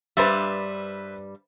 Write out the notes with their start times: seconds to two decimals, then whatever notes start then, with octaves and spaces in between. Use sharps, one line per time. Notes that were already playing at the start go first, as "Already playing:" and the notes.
0.17 G2 G3 B4 C5 E5